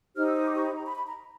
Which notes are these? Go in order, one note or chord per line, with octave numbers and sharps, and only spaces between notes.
D#4 G4 C5 F6
E6
D#6
D6
C#6
B5
A#5
B5
B5
A#5